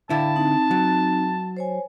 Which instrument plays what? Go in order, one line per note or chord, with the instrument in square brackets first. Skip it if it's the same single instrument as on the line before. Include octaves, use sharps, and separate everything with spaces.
[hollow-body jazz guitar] D3 E4 [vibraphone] F5 G5 B5 [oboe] A5
[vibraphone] C4 D#4
[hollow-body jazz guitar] F#3
[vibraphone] C5 C#5 G#5